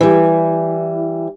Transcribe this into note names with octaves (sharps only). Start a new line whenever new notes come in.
E3 G3